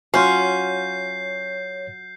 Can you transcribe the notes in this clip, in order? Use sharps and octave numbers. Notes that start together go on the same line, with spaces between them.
F#3 C#4 F4 F#4 C#5 G6 C7